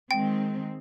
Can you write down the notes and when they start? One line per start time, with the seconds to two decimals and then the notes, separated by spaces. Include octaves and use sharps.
0.11 D#3 G#3 C4 G5